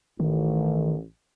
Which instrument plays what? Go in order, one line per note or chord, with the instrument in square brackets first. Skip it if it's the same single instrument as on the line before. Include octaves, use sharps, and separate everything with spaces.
[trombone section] A1 [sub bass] D#3